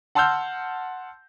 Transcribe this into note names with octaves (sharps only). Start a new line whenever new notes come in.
F#5 A5 C6 E6 F6 G6